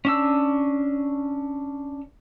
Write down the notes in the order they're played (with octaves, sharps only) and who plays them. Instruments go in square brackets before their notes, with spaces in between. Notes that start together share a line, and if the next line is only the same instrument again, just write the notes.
[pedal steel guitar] C#4 D4 E6